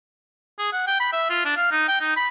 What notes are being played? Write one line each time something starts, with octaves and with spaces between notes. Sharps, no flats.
G#4
F#5
G5
B5
E5
F4
D4
F5
D#4
G5
D#4
B5